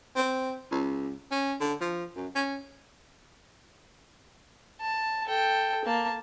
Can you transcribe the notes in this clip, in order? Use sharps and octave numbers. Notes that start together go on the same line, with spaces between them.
C4
C#2
C#4
D3
F3
F#2
C#4
A5
A4 G5
A#3 A5